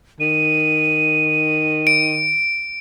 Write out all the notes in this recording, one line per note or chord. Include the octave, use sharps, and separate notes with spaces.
D#3 D#7
D7